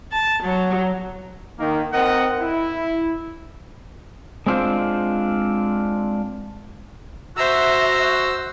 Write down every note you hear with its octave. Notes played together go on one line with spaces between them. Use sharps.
A5
F#3
D#3 A#3
C4 A#4 D#5 F#5
E4
G#3 C4 D4 F4 C5
F#4 C5 E5 A#5 E6